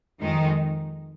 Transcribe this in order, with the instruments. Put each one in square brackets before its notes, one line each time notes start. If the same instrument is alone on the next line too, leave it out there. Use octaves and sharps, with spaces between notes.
[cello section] F2 D#3 G#3 D#4